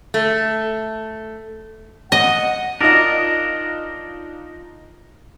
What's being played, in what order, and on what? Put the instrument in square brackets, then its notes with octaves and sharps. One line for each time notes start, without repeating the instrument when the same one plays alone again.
[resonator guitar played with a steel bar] A3
[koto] D#5 [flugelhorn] F#5
[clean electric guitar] D4 A#4 [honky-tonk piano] D#4 F4 D#5